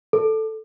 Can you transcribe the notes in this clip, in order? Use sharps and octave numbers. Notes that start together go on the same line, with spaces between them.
A4